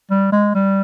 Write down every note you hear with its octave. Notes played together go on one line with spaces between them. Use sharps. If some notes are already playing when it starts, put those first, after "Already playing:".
G3
G#3
G3